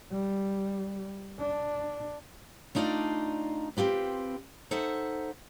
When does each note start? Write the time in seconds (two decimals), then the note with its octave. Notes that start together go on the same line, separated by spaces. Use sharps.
0.12 G3
1.39 D4
2.75 A3 D4 D#4 F4 D5 F5
3.77 C4 F4 G4 B4
4.71 D#4 A4 C5 E5 F#5